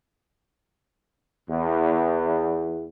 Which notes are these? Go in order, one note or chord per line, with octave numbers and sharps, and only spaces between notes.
E2